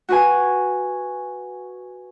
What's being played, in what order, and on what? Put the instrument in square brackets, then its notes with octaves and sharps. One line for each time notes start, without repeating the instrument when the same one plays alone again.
[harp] F#4 B4 G#5